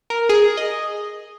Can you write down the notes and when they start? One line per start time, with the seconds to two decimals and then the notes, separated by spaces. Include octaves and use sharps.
0.10 A#4
0.29 G#4
0.57 D#5